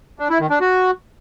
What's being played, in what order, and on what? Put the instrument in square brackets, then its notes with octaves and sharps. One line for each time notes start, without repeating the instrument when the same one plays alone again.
[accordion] D4
E4
D#3
D4
F#4